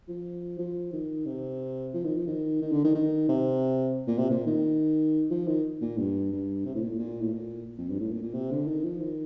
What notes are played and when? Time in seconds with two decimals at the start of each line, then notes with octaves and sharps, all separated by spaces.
0.08 F3
0.58 F3
0.93 D#3
1.26 C3
1.94 F3
2.04 D#3
2.16 F3
2.27 D#3
2.61 D#3
2.72 D3
2.84 D#3
2.95 D#3
3.29 C3
4.07 A#2
4.19 C3
4.30 A#2
4.46 D#3
5.30 F3
5.47 D#3
5.82 A#2
5.98 G2
6.32 G2
6.65 C3
6.75 A2
6.82 A#2
6.92 A2
6.99 A#2
7.21 A2
7.33 A#2
7.78 F2
7.89 G2
8.00 A2
8.11 A#2
8.22 A#2
8.34 C3
8.51 D3
8.67 D#3
8.84 F3
9.01 D#3